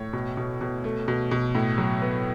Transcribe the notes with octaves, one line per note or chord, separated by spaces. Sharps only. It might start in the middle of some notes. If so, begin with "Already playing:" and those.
Already playing: A2 C#5
B2
B2
B2
A3
B2
B2
A2
F#3
B3